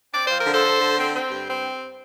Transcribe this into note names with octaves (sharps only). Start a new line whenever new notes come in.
C4 D5
F3 C5
A#4
D3
A4 C5
D3
D3
C4
C4
G2
C4